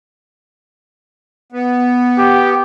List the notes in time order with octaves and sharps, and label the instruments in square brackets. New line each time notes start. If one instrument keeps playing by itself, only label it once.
[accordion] B3
[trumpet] G4